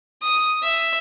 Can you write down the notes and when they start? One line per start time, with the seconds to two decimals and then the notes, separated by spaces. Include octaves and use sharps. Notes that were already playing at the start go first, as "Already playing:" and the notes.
0.23 D#6
0.63 E5